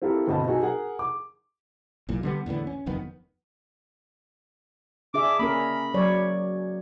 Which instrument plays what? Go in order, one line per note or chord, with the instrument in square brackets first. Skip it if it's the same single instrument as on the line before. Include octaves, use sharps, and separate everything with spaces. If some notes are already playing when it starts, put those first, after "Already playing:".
[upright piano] C4 E4 F4 G4 A4 A#4
G1 B2 C4 D#5 A5 B5
C4 D#4 F#4 G#4 A4 G#5
G#4 A#4 F#5
D6
[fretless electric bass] B1 E2 A#2
D3 G3 B3
E2 A2 D3 B3
C#4
F#1 F2 D#3 B3
[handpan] D4 G#4 E5 [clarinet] D6
[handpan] A#3 C#4 A#4 [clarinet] B5
[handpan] F#3 C#5 D5